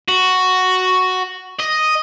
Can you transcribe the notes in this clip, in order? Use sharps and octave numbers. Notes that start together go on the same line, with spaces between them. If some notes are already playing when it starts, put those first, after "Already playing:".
F#4
D#5